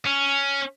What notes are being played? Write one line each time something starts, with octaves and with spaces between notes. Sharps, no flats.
C#4